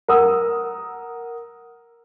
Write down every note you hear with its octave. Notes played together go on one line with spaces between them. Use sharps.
A#4 F#5 D#6 E6